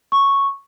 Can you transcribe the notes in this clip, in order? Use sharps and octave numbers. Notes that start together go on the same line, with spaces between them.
C#6